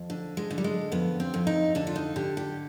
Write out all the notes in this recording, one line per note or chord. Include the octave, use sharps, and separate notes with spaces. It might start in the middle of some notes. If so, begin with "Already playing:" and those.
Already playing: F2
D3
G#3
D3
G3
G#3
F2 B3
C4
F2
D#4
D3 D4
F4
D#4
D3 G4
G4